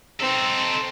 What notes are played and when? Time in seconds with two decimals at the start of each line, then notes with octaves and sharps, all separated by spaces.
0.20 C4 D#4 A4